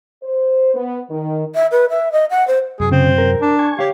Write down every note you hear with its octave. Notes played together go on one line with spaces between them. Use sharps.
C5
B3
D#3
E5
B4
E5
D#5
F#5
C5
F#2 C3 F#3 G#4
C#3 C4
A#4
D4
G#5 C#6 G#6
G4 C#5 F5